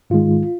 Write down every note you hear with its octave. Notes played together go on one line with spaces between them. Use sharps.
G#2 D#3 G#3 F4